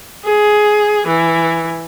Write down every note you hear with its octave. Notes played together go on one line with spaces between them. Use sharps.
G#4
E3